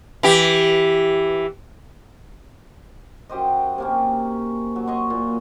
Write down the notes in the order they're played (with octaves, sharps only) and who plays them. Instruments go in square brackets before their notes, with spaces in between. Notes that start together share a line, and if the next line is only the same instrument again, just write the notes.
[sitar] E3 G4
[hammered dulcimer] F#2 G4 C5 D#5
C3 A#3 C#4
F#3
C#5 D#5 C6 C#6
A#2